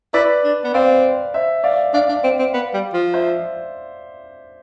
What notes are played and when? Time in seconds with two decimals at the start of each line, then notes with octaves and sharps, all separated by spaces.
0.14 E4 B4 D5
0.44 D4
0.64 B3
0.74 C4 D5 F5
1.34 C5 E5
1.64 D5 F5
1.94 D4 D5 F5
2.09 D4
2.24 C4
2.39 C4
2.54 B3
2.74 G3
2.94 F3
3.14 C5 E5